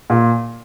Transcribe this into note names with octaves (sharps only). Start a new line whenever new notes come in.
A#2